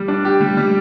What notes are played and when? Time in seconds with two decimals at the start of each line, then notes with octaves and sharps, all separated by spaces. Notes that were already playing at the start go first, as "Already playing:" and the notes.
Already playing: G3
0.08 D4
0.25 G4
0.41 G3
0.57 G3